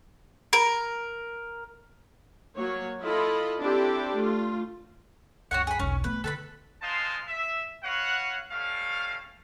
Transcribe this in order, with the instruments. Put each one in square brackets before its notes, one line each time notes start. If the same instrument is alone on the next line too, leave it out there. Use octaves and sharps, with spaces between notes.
[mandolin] A#4
[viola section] F#3 A#3 C#5
E4 F4 A4 D#5 B5
C4 D4 E4 G4 A4
A3 F4
[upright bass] C#2 F#2 [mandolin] F#4 C#5 F#5
[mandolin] G#4 B5
[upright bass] E1 B1 [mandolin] C#4
[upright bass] A3 B3 [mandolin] B4
[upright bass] D3 [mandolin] A4 B4 B5
[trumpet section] G#3 D#4 C5 F5 A5 C6
E5
F#4 B4 C#5 F5 F#5
G3 A3 C#4 A4 F5